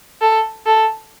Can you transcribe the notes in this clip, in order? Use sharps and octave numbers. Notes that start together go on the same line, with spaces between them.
A4
A4